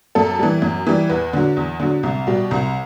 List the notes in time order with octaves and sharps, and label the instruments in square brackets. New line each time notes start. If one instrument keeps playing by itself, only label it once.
[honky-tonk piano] F#2 A4
E3 G3
F#2
E3 G3
E2 B4
D3 F#3
E2
D3 F#3
C2
B2 G3
C2